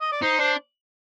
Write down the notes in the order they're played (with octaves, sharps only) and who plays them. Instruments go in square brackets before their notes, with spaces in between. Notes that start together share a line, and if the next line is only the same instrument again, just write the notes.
[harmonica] D#5
D5
[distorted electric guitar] D#4 [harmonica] C5
[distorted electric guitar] D4 [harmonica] C5